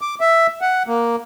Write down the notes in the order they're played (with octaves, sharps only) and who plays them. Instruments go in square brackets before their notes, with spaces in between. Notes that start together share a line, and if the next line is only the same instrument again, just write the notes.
[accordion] D6
E5
F#5
A#3